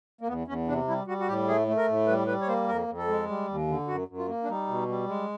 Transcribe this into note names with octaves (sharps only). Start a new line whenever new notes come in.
A#3
E2 B3
E2 C#4
C3 D4
G3 E4
G3 F#4
F#4
A2 G4
A3 G#4
A3
A#4
A2
G3 B4
G3 B4
C#5
A#3 C5
F2 A#4
F2
A4
G#3
G3
D#2
D3
F#2 F#4
F#2
F4
A#3
D4
G3 D#4
B2
G3
G#3